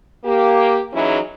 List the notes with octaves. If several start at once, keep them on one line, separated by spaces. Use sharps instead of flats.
A#3 G4
E3 F#3 C#4 D#4 E4 G#4